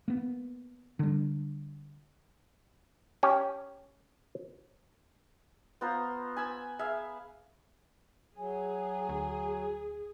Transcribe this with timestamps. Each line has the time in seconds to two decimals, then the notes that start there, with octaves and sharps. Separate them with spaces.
0.08 A#3 B3
0.99 D3 G3
3.23 C#4 G4
5.81 B3 F4 C5 A#5
6.36 G#5 B5 E6
6.79 G#4 E5 F5
8.38 F#3 G#4 G#5
9.09 D2